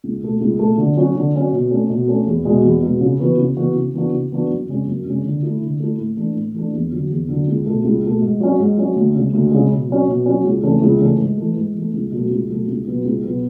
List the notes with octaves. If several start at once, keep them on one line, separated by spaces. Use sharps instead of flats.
C#2
B2 A3
C#2
B2 A3
D3
F#3 C#4 F#4
D3
F#3 C#4 F#4
B2
A3 C#4
B2
A3 C#4
E2
B2 G#3
E2
B2 G#3
C#3
E3 B3 F#4
C#3
E3 B3 F#4
C#3
E3 B3 D4 F#4
C#3
E3 B3 D4 F#4
F#2
C#3 G#3 C#4
F#2
C#3 G#3 C#4
D3
A3 E4
D3
A3 E4
A2
E3 A3 D4
A2
E3 A3 D4
E2
D3 F#3
E2
D3 F#3
C#2
B2 A3
C#2
B2 A3
G#2
F#3 C#4
G#2
F#3 C#4
D2
C#3 G#3
D2
C#3 G#3
B2
F#3 C#4
B2
F#3 C#4
C#2
C#3 E3 A3 C#4
C#2
C#3 E3 A3 C#4
G#2
E3 A3
G#2
E3 A3
C#2
B2 F#3 A3
C#2
B2 F#3 A3
C#2
B2 F#3 B3
C#2
B2 F#3 B3